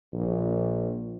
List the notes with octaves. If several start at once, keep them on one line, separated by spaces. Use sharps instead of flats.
A#1